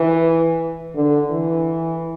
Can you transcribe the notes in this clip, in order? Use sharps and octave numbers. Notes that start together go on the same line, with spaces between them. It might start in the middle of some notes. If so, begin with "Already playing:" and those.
Already playing: E3
D3
E3